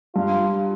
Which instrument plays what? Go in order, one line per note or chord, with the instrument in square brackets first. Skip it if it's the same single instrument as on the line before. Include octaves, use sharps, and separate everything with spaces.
[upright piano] G2 [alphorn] F4